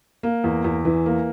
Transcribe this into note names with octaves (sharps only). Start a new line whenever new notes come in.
A#3
E2
E2
E3
A#3